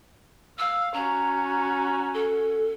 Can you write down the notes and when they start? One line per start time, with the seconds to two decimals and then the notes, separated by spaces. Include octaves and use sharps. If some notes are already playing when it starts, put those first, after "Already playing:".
0.59 F5 E6
0.94 C#4 F#4 A#5
2.14 A4